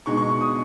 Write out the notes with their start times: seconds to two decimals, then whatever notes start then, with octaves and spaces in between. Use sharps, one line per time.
0.06 B2 G#3 D#4 C#6
0.17 C#6
0.29 C#6
0.41 D#6